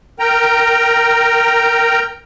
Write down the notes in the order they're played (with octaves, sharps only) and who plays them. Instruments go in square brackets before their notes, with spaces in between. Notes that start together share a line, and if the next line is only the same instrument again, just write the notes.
[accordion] A#4 G5 A#5